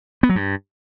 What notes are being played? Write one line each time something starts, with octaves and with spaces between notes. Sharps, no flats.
B3
F#3
G2